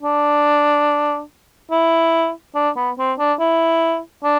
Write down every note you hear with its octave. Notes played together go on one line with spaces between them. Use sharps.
D4
E4
D4
B3
C4
D4
E4
D4